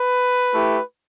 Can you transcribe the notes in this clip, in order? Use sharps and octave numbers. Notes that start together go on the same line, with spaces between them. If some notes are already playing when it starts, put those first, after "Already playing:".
Already playing: B4
A3 E4 G4